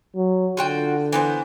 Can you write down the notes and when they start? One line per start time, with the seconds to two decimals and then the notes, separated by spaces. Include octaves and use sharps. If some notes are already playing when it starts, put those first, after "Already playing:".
0.16 F#3
0.57 D3 F4 F#4 G5
1.13 E3 B3 C5